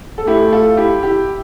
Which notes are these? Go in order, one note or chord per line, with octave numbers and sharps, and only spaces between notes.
A4
A3 E4 G4
F4 A4
E4 G4
E4 G4